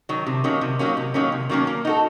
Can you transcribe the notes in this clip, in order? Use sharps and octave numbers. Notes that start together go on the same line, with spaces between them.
D#3 F#3
C3
D#3 F#3 A#3 C#4
C3
D#3 F#3 A#3 C#4
C3
D#3 F#3 A#3 C#4
C3
D#3 F#3 A#3 C#4
A#3
D#4 F#4 A4